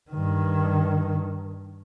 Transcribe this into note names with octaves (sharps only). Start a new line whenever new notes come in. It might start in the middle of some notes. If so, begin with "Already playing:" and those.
G2 D#3